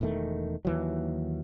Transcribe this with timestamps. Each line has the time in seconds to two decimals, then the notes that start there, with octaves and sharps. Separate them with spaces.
0.01 E1 E2 D#3 A3
0.65 D#2 E3 F#3